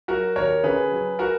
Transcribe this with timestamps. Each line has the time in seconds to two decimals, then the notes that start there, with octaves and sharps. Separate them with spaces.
0.08 F#3 F#4 A#4
0.36 D#2 A#4 C#5
0.63 C#3 G#4 B4
0.92 F#3
1.19 F#4 A#4